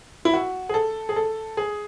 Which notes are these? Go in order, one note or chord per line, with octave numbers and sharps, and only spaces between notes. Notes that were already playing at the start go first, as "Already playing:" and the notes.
E4
F#4
G#4
A4
G#4
A4
G#4